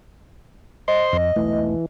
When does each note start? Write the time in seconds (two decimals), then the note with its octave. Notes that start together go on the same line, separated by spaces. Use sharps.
0.88 C5 D#5 C6
1.13 F2
1.36 E1 B1 E3 A3